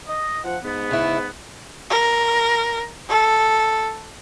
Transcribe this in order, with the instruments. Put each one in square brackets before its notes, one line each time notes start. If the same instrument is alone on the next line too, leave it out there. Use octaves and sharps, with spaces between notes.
[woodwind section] D#5
F3 F#5
G#2 B3
[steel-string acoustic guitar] C#3 E4
[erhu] A#4
A4